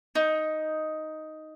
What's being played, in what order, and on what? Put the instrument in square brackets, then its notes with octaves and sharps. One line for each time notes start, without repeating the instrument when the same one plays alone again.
[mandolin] D#4